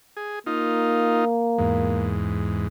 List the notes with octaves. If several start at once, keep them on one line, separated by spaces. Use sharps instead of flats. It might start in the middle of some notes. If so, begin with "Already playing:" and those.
G#4
A#3 D#4 F4
E2 G#2